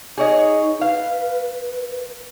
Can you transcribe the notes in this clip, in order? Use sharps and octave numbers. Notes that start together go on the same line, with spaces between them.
D#4 G#4 C#5 D#5
B4 F5